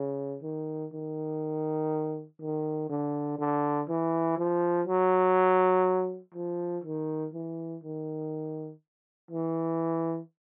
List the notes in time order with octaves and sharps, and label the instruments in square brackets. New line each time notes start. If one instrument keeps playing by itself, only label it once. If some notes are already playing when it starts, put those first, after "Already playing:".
Already playing: [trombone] C#3
D#3
D#3
D#3
D3
D3
E3
F3
F#3
F3
D#3
E3
D#3
E3